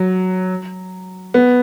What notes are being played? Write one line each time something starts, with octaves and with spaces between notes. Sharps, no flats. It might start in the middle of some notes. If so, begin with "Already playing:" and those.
Already playing: F#3
B3